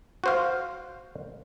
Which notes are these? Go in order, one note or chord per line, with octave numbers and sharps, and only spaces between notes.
F#4 C5 F5